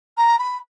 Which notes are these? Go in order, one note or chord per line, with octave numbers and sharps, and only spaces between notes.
A#5
B5